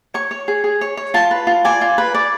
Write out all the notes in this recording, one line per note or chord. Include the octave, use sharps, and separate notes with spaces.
C#5 C#6
C#5
G#4
G#4
C#5
C#5
F4 A5
B4
F4
D5 G#5
F4
B4
D5